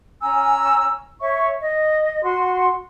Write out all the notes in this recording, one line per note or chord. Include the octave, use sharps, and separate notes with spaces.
C#4 G#5 A#5 E6
C#5 E5 C#6
D#5
F#4 C6